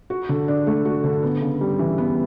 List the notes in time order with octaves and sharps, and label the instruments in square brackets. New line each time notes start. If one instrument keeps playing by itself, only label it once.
[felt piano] F#4
D3
D4
A3
F#4
D3
B3
C#3
G3
E3
B3